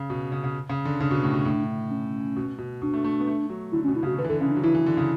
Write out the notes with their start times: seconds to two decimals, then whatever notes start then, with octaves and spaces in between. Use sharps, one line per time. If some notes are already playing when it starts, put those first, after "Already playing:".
Already playing: C#3
0.10 B2
0.32 C#3
0.44 C#3
0.69 C#3
0.85 D3
1.00 C#3 D4
1.11 B2
1.23 A2
1.34 B2
1.45 A2
1.90 C#4
2.36 B2
2.58 B2
2.82 B2 D4
2.94 A3
3.04 A3
3.20 B3
3.27 A3
3.50 F#3
3.72 D3 E4
3.84 C#4
3.88 B2
3.96 E4
4.03 C#3
4.07 F#4
4.18 D3 B4
4.24 E3
4.29 D3 A4
4.41 C#3 C#4
4.52 D4
4.56 F#3
4.63 E3 E4
4.75 E3
4.86 D3
4.97 C#3